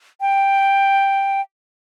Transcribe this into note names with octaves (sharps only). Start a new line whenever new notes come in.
G5